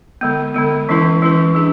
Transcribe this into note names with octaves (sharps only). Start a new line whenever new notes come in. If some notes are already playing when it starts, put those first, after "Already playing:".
D3 G#3 B3
D3 G#3 B3
E3 G#3 C#4 E4 B4
E3 G#3 C#4 E4 B4
G#3 D4 G#4